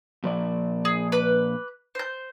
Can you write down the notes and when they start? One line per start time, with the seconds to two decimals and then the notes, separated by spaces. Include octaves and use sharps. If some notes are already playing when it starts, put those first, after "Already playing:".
0.24 A#2 F3 D5
0.85 G#4
1.12 B4 D6
1.95 C5 G6